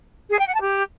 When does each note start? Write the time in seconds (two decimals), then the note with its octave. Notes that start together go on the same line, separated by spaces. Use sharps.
0.31 G#4
0.38 G5
0.46 F#5
0.54 A5
0.61 G4